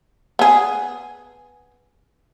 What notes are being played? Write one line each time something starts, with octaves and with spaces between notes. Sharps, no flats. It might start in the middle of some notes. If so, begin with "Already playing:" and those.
B3 G#4